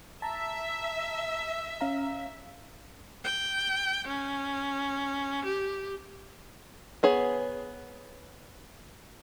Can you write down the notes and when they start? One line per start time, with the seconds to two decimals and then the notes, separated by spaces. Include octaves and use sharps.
0.22 E5 A5 A#5
1.81 C#4 F5 A#5
3.24 G5
4.08 C#4
5.45 G4
7.03 B3 G#4 C#5